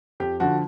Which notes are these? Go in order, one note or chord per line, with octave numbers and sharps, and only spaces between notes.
F2 G4
D3 F3 F#4